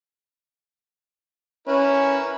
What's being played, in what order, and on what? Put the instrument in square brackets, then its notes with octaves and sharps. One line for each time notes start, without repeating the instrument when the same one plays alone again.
[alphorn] C#4 [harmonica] E4 A#4 B4